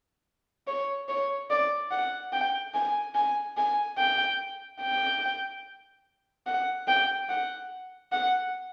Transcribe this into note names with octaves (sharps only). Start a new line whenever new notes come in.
C#5
C#5
D5
F#5
G5
G#5
G#5
G#5
G5
G5
F#5
G5
F#5
F#5